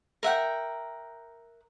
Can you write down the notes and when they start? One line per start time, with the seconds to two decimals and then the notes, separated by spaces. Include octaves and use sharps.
0.23 A#4 E5 F#5 G5